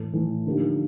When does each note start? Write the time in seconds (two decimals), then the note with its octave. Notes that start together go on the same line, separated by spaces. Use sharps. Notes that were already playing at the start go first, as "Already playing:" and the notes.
Already playing: A2 E3 A3
0.13 A2 E3 A3
0.46 D3 F3 A#3 D#4 G4